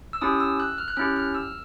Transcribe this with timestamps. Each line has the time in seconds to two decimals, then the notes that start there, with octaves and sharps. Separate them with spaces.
0.13 E6
0.21 C#4 E4 G4 D#6
0.40 E6
0.60 F#6
0.78 F6
0.88 F#6
0.97 C#4 E4 G4 F6
1.16 F6
1.34 E6